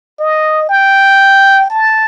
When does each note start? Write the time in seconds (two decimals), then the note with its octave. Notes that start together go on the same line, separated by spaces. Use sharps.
0.19 D#5
0.69 G5
1.70 A5